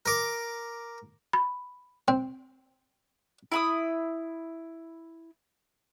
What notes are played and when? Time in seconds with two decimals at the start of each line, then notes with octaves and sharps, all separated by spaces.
0.06 A#4 D6
1.33 B5
2.08 C4
3.52 E4 B5 D#6